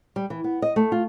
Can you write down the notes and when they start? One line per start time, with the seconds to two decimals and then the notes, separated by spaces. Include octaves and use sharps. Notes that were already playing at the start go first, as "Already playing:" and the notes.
0.16 G3
0.30 E3
0.44 B3
0.62 D#5
0.76 A3
0.92 F4